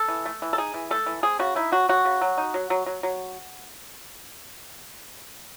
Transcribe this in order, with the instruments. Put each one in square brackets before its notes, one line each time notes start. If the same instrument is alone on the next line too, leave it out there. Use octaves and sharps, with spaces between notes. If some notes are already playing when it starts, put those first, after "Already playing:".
Already playing: [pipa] A4
E3
A3
E3
A4
D#4 G#4
E3
A3 A4
E3
C4 G#4
C#3 F#4
D#4 E4
F#3 F#4
F#3 F#4
C#3
F#3
D#4
F#3
F#3
F#3
F#3